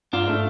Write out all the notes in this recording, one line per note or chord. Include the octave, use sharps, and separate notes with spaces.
G#2 D4 F4
A3